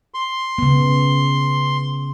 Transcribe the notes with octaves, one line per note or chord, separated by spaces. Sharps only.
C6
C#3 B3